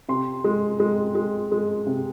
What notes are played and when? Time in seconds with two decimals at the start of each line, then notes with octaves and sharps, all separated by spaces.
0.09 C3 C6
0.44 G#3
0.80 G#3
1.15 G#3
1.52 G#3
1.87 C3